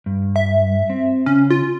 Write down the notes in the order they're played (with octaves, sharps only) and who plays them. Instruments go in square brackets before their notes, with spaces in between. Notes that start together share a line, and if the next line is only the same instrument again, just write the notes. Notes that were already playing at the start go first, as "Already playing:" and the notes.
[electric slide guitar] G2
[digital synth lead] E5
[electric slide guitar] C4
[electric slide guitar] C#3 [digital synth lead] C#4
[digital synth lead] F4